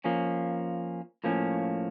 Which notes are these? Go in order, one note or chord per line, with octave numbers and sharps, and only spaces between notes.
F3 A#3 C#4
A2 F3 A#3 C#4